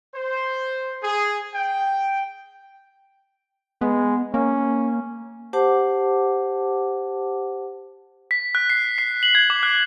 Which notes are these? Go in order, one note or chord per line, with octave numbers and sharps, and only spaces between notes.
C5
G#4
G5
G#3 B3
A#3 C#4
G4 C5 F#5 A5 D6
B6
F#6
C7
C7
F#7
G#6
D6
F#6